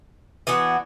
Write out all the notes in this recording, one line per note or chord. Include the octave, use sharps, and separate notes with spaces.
E3 B3 D4 F#4